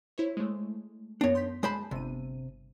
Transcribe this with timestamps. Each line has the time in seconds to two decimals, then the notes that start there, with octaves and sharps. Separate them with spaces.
0.18 E4 C5 C#5
0.37 G#3 A3
1.21 F#2 B3 D4 C#5 A#6
1.35 C6 G6 B6
1.63 G#3 C5 G#5 A5 B5
1.91 G1 C3 D#7